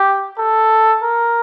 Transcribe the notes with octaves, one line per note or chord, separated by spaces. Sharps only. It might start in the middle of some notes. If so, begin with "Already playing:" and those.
Already playing: G4
A4
A#4